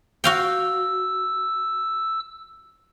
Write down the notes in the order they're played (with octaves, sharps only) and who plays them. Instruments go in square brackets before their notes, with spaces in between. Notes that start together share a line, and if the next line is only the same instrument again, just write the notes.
[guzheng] F#4 F5 G5 [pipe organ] E6